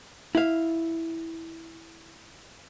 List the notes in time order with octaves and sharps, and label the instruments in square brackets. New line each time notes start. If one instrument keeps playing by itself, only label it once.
[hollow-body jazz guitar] E4 F5